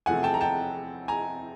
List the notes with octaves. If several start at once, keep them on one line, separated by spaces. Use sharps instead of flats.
E2 C3 F3 A3 F#5 G#5
G5 A5
A#5
G5 A5
G#5 A#5